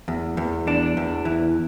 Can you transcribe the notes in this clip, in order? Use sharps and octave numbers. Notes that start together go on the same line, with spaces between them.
E2
E2
D4
E2
E3